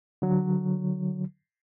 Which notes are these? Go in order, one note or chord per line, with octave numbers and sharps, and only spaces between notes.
D3 F#3